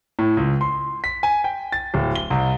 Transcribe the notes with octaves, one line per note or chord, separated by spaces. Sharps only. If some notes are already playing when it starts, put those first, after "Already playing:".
A2
C#2
C6
B6
G#5
G5
A6
D1
G7
C2